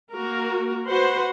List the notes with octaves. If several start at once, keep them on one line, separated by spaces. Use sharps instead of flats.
A#3 F#4 A#4
F#4 B4 C5 F#5 C6